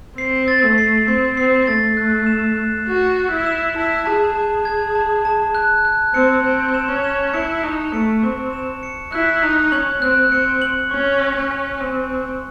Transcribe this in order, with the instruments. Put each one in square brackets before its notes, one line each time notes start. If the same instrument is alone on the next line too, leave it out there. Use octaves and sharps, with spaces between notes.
[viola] C4 [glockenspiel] C7
[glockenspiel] A6
[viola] A3
[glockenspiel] C7
[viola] C4 [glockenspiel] C7
[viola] C4 [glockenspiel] C7
[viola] A3 [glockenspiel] A6
[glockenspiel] F#6
E7
F#6
[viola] F#4 [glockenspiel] F#6
[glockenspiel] F#6
[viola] E4
[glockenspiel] E7
[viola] E4 [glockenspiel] A5
[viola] G#4 [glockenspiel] A5
[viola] G#4 [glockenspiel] A5
[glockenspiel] G#6
A5
A5
F#6
F#6
[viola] C4 [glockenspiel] C#7
[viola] C4 [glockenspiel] F#6
[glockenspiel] E7
[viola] C#4
[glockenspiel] E7
[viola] E4 [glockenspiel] C#7
[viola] D#4 [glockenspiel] C#6
[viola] A3 [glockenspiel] C#7
[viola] C4 [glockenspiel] C#6
[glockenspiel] E7
C#7
[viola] E4 [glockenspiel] F#6
[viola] D#4 [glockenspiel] F#6
[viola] C#4 [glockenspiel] F#7
[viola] C4 [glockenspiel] F#6
[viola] C4 [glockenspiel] C#7
[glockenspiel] F#7
[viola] C#4 [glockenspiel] C#6
[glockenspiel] G#5
[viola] C#4
[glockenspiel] G#5
[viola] C4 [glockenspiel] G#5
[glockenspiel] G#5